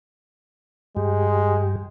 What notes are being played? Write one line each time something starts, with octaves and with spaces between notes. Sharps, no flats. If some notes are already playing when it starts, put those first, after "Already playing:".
G2 G#3 G4